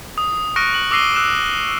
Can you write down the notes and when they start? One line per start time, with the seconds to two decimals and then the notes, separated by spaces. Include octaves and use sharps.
0.18 D#6
0.56 C#6 F6 F#6 A#6 C#7 D7
0.74 F#7
0.91 D6 E6 A#6 C7 D#7 G7
1.16 E6 F#6 E7